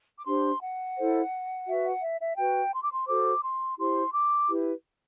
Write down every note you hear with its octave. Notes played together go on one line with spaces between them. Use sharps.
D6
D4 G4 C5 C6
F#5
E4 A4 C5
F#4 B4 E5
F#5
E5
E5
F#4 B4 G5
C6
D6
C6
F#4 A4 C5 D6
C6
E4 G4 C5 C6
D6
E4 G4 B4